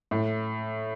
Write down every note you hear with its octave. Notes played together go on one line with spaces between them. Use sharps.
A2